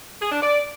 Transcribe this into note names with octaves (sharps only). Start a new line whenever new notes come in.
G#4
D4
D5